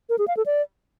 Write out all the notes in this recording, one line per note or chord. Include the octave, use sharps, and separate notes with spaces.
A#4
G#4
F5
A4
D5